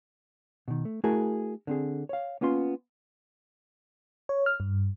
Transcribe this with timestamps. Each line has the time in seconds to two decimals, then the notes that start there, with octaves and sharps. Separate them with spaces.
0.68 B2 D#3
0.85 A3
1.04 A3 E4 F#4 G#4 A#4 A5
1.67 D3 C4 G#4
2.09 C#5 F5
2.41 A#3 B3 C#4 F4 C6
4.29 C#5
4.46 F6
4.60 G2